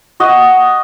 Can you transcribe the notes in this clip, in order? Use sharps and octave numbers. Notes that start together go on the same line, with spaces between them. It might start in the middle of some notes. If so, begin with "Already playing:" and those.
F#4 D#5